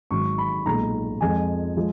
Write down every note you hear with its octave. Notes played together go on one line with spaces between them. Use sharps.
G#1 G#2 F#3 C#6
B5
B1 A#2 G#3 A#5
F2 F3 G#3 G#5
F3 G#3